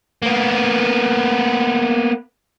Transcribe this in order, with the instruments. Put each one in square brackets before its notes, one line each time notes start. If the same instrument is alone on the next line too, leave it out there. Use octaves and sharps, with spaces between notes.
[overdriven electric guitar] A#3 B3